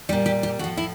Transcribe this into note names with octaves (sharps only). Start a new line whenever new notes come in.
A#2 G3 G4
G4
G4
A2 F3 F#4
E4